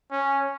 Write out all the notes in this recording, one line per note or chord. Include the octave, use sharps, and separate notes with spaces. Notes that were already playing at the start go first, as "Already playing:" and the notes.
C#4